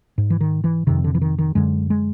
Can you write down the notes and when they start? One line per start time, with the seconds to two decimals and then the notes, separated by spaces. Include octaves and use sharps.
0.18 G#2
0.30 E3
0.41 D#3
0.64 E3
0.87 F2 C3 D#3
1.04 D3
1.15 E3
1.22 D#3
1.39 D#3
1.55 F#2 D3 G#3
1.90 G#3